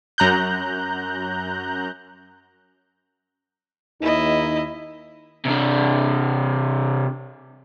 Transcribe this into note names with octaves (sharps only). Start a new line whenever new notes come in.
F#2 A#5 F#6 G6
D#2 D#4 E4 D#5
C3 D4